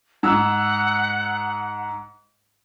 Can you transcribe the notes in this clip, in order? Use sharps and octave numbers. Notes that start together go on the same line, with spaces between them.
G#2 F#5 E6